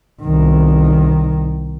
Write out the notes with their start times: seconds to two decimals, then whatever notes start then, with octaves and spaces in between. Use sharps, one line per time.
0.23 C2 D#3